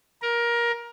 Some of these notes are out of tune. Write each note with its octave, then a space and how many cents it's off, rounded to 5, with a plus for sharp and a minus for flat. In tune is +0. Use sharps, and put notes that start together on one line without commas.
A#4 +20